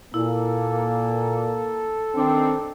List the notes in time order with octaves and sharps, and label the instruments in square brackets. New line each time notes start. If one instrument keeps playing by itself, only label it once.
[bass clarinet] A#2 [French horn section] A#3 [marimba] E4 [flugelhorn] A4
[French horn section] D#3 C4 [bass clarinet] D4